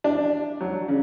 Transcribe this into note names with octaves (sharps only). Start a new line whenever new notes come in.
D4
F#3
C#3